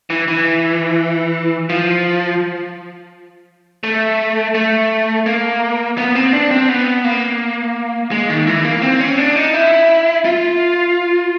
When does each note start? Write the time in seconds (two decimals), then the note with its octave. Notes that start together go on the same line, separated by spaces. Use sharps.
0.10 E3
0.28 E3
1.69 F3
3.84 A3
4.55 A3
5.26 A#3
5.98 B3
6.15 C4
6.33 D4
6.51 C4
6.69 B3
7.04 A#3
8.11 G#3
8.29 D#3
8.47 E3
8.65 A#3
8.82 C4
9.00 C#4
9.18 D4
9.36 D#4
9.54 E4
10.25 F4